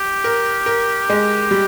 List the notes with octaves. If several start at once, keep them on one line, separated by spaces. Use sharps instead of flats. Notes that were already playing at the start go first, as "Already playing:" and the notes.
Already playing: G4
A#4
A#4
G#3
G3